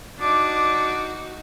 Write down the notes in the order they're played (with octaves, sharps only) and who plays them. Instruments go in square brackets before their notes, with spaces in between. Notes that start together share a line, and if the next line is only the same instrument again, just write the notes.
[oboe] D4 [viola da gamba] D#4 F#4 [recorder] D6